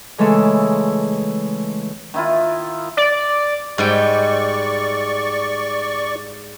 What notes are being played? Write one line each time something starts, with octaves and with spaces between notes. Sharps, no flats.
C#3 E3 G#3 A3 A4
D#3 E4 F4
D5
G#2 G3 D5 G5 C#6